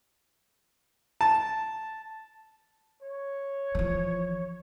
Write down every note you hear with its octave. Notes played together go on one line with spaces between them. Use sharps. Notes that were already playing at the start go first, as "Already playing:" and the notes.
A5
C#5
E3 F3